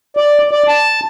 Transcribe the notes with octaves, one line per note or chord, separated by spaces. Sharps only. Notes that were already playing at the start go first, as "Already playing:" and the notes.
D5
D5
A5